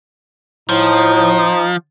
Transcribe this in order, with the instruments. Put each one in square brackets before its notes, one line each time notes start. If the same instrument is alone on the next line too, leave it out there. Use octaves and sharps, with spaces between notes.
[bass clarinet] A2 [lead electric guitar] F3 [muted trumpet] D#4